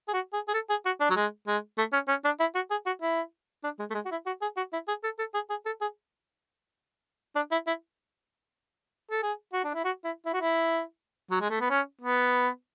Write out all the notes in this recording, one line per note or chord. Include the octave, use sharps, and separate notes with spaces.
G#4
F#4
G#4
G#4
A4
G#4
F#4
D4
F#3
G#3
G#3
A3
C#4
C#4
D4
E4
F#4
G#4
F#4
E4
D4
G#3
A3
G#3
F#4
E4
F#4
G#4
F#4
E4
G#4
A4
A4
G#4
G#4
A4
G#4
D4
E4
E4
A4
G#4
F#4
D4
E4
F#4
E4
E4
F#4
E4
F#3
G#3
A3
B3
C#4
B3